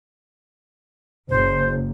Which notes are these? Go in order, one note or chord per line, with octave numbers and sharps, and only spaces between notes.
F#1 C5